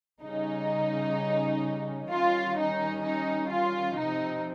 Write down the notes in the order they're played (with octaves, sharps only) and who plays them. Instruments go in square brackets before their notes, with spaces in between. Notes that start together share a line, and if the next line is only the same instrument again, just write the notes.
[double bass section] C#3 G3 C#4 [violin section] D#4
[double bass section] D#3 G3 C#4 [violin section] F4
[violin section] D#4
D#4
F4
[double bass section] C3 F3 C4 [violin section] D#4